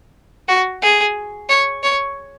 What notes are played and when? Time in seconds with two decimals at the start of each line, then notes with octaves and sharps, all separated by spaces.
0.48 F#4
0.82 G#4
1.49 C#5
1.83 C#5